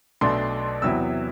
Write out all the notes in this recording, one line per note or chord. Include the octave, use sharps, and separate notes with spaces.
B1 B2 A3 D4 C6
E2 C3 F#3 B3 E4 E6